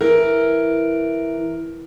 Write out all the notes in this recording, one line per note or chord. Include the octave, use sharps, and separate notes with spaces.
E3 A#4